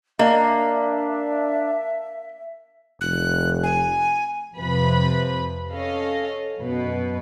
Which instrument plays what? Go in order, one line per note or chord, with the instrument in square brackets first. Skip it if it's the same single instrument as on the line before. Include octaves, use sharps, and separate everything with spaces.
[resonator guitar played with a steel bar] A#3 [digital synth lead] D4 [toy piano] D#5 [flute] E5
[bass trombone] F1 [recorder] F#6
[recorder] G#5
[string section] F2 C3 F3 B4 B5
C#4 A4 D#5 F5
F#2 B2 B4